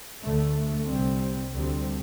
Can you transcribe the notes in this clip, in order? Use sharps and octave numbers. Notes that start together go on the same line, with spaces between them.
D2 D3 A3
C2 C3 G3 C4
D2 D3 G3 C4